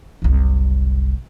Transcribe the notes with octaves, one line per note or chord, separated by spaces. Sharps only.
F#1 C2